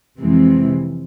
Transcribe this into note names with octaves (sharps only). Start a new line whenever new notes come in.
F2 C3 E3 G#3 C4